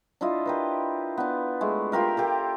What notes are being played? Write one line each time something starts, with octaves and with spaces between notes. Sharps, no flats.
D4 E4 F4 D#5
G4 A#4 B4
B3 D4
G#3 A3
F4 G4 A#4 E5
G4 A4 A#4